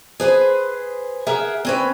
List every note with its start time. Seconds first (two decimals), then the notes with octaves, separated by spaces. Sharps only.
0.20 G#4 B4 C5
1.27 G#4 A#4 E5 F#5
1.65 C4 C#4 B4